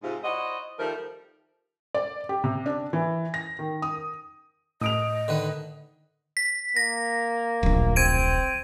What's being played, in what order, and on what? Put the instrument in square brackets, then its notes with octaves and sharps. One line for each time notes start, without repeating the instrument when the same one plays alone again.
[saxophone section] G#2 C3 F4
E4 F#4 C5 D5 D#5
D#3 F3 G3 A3 A#4 C5
[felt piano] D5
G4
C3
D4
E3
A#6
D#3
D#6
[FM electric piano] A2 [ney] D#5 [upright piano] D#6 D7 F7
[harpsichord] D3 D#3 B4
[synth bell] B6
[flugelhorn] A#3 [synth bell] A#6
[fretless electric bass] D1 A#1
[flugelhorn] C4 [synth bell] G#6 D7 D#7